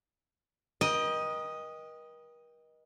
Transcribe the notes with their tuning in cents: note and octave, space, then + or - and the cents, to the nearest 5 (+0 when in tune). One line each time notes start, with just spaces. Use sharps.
A#4 +45 D#5 +0 G5 +20